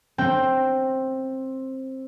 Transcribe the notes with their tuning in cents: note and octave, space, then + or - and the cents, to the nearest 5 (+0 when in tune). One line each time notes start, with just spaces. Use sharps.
C4 +15 G5 +0